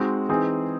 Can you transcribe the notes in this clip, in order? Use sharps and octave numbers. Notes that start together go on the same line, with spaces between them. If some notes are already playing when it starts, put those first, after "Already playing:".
Already playing: G#3 C4 D#4 F#4
E3 C4 D#4 G#4